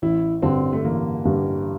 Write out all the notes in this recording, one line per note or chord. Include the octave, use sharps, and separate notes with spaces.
A1 E4
G2 D3 G3 C4
A3
A1 A#3
G2 D3 G3